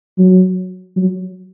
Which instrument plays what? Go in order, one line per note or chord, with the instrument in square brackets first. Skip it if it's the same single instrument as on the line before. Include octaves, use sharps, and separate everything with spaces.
[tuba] F#3
F#3